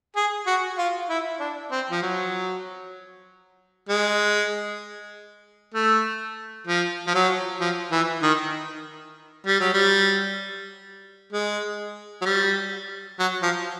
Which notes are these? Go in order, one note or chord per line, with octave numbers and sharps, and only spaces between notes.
G#4
F#4
F4
E4
D4
C4
F3
F#3
G#3
A3
F3
F3
F#3
F3
E3
D#3
G3
F#3
G3
G#3
F#3
G3
F#3
F3